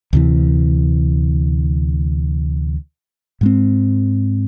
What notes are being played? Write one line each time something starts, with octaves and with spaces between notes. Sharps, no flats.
D2 C3 E3
G#2 G#3 C4